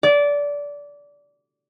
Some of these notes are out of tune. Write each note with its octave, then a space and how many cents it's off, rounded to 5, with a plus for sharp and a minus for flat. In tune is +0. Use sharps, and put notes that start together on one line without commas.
D5 -20